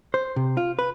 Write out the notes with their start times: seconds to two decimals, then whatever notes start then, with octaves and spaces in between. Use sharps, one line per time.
0.14 C5
0.36 C3
0.57 F4
0.79 B4